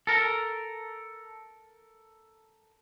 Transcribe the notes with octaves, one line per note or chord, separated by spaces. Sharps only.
A4 A#4